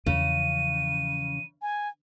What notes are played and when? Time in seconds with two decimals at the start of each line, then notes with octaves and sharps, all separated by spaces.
0.06 E2 C#3 F3 D#7
1.62 G#5